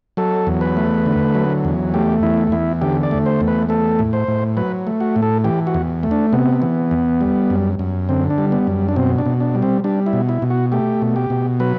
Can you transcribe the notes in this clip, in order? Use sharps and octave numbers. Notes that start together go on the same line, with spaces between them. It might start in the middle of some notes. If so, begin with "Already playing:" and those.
F#3 A4
E2
B4
A3
D3
F#3
E2
A3 G4
E2 E4
E2 E4
D3 G4
D5
A3
C5
E2
B4
A3 A4
A2
C5
A2
F#3 B4
A3
F#4
A2
A4
E3 G4
F#4
E2
A3
D4
C3 B3
E3
E2
G3
F#2
F#2
D3 C4
D4
G3
B3
F#2
D4
B2 C4
D4
B2
D4
G3
C4
G3 D4
E4
B2
E4
B2
F#4
A3 G4
B2
G4
B2
F#3 B4